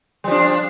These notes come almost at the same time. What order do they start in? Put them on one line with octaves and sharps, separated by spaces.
G3 F3 D4